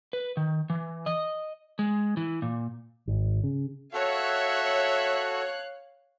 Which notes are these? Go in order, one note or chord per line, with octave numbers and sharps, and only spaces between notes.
B4
D#3
E3
D#5
G#3
E3
A#2
G#1
C#3
F#4 A4 C#5 E5 F5 F#6